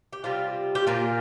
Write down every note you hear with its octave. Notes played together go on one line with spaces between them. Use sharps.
G4
C3 G3 C4 F4
G4
A#2 A#3 F4